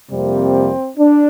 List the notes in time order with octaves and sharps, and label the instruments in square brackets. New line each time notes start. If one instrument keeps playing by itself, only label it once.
[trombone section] F2 C3 G3 A#3 C4
D4